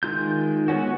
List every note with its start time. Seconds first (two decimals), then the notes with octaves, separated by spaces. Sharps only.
0.03 D#3 G#3 F4 G6
0.68 G#3 B3 C#4 F#4